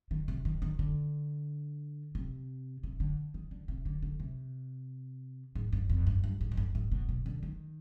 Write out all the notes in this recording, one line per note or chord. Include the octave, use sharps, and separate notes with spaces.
D#3
C3
D#3
D#3
D3
C3
C3
D3
D#3
D3
C3
D3
D3
C3
G#2
G2
F2
G2
G2
G#2
F2
G2
G#2
B2
B2
D3
D#3